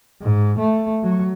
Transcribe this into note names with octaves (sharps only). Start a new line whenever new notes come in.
G#2
A3
F#3